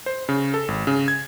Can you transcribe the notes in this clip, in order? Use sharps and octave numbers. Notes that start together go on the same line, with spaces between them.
C5
C#3
A4
G#1
C#3
G#6